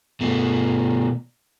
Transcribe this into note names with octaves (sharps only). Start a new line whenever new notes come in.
B2 A3